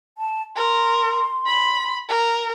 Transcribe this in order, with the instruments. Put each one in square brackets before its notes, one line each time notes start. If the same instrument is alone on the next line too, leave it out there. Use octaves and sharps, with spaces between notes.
[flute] A5
[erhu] A#4 [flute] C6
[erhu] B5
A#4